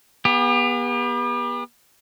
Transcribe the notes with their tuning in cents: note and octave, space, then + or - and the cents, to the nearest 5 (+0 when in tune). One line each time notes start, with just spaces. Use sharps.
B3 -30 G4 +40